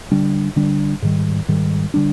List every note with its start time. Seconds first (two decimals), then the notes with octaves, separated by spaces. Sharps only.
0.11 D3 G3 D4
0.56 D3 G3 D4
1.02 G#2 D#3 G3
1.48 G#2 D#3 G3
1.94 D3 G3 D4